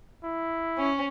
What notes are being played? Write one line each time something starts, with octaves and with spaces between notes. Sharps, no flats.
E4
C#4